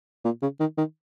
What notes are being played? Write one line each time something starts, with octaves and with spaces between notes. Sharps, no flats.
A#2
C#3
D#3
D#3